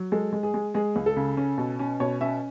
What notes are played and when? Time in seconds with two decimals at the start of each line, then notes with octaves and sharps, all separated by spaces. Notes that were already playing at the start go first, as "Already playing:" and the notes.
Already playing: F#3
0.12 G#3 A4
0.33 G#3
0.43 G#4
0.54 G#3
0.74 G#3 G#4
0.96 C#2
1.06 A4
1.16 C#3
1.37 C#4
1.58 B2
1.79 C#4
2.00 B2 C#5
2.21 C#4 E5